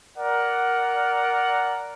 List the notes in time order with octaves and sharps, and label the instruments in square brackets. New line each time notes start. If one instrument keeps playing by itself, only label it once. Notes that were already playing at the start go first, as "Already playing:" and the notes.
[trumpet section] A#4 D5 F#5